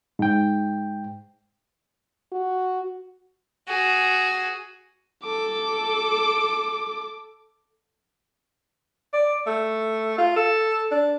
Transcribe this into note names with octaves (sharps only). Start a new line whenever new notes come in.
G#2 G5
F#4
F#4 G#4
A4 D6
D5
A3
F4
A4
D4